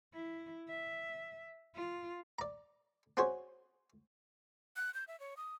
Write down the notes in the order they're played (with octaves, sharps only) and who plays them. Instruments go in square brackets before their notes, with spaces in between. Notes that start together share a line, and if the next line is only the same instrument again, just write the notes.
[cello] E4
E5
F4
[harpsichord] D5 A#5
C4 C#4 F#4 G#4 C5 C#5
[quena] F#6
G6
E5
C#5
D#6